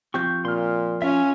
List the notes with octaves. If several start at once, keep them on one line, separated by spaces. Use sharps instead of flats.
F3 C4 G4 C#6 G6
A#2 C6 F6
C#4 F4 E5 G#5